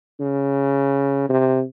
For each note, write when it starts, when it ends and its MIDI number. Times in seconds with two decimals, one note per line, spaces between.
0.20 1.26 49
1.29 1.63 48